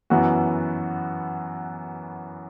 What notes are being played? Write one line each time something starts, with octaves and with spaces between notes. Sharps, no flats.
F#2 E3 B3 F#4